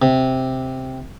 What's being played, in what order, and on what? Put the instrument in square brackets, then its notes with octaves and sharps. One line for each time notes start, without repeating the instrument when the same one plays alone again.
[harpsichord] C3